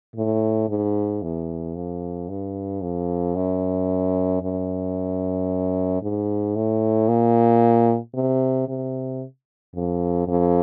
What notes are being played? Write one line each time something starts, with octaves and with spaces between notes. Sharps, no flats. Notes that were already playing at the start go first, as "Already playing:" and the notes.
A2
G#2
E2
F2
G2
F2
F#2
F#2
G#2
A2
A#2
C3
C3
F2
F2